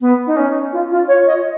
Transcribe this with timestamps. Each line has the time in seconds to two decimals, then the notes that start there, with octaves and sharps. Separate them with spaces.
0.01 B3
0.27 D#4
0.37 C#4
0.73 F4
0.91 F4
1.08 C#5
1.27 D#5